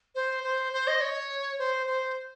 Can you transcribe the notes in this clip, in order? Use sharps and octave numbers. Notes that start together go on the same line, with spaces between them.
C5
C5
C5
D#5
C#5
C5
C5